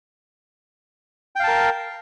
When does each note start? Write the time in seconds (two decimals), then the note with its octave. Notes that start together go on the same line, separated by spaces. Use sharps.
1.36 G5
1.40 F5
1.44 A5
1.48 A#4